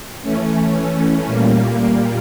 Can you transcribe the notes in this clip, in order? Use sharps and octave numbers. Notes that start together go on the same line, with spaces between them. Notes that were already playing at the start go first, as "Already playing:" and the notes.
E3 A3 C#4
A#2 G3 A#3